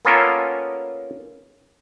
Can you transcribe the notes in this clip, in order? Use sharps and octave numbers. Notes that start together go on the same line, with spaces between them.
A#3 B3 C#4 F4 A4 A#4